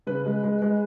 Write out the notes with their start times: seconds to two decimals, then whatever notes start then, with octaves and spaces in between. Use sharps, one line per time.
0.07 C#3 B4
0.25 G#3
0.43 G#3
0.62 G#3